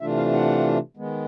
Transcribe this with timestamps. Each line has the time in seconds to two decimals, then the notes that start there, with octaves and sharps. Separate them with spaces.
0.01 C3 E3 A3 D4 F4 E5
0.17 F5
0.33 F#5
0.97 D#3 G#3 B3